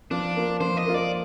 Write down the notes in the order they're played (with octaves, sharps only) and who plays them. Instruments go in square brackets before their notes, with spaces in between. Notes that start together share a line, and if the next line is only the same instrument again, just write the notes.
[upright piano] F3 [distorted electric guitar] D4
[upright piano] A#3 F4
[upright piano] F3 [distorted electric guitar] C5
[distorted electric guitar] D#5
[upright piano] A#3 F4
[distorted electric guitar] D5